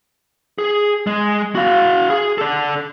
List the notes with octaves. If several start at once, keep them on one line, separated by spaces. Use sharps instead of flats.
G#4
G#3
F#4 F5
G#4
A4 D5